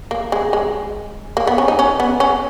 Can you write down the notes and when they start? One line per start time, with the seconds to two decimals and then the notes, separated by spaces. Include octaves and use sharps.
0.11 A#3
0.32 G#3
0.53 G#3
1.37 A#3
1.47 B3
1.58 C#4
1.68 D#4
1.79 C#4
2.00 B3
2.20 C#4